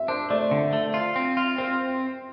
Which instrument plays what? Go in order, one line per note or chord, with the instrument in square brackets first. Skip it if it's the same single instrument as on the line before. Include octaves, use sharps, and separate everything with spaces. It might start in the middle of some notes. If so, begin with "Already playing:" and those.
Already playing: [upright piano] E5
[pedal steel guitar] D4 [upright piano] C5
[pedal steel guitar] A3 [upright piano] D5
[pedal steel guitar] D3
A3
F4
C4
F4
[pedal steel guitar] C4 [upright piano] C5